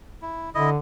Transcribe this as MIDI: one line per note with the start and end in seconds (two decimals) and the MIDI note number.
0.22 0.50 64
0.55 0.77 50
0.55 0.70 64
0.55 0.70 75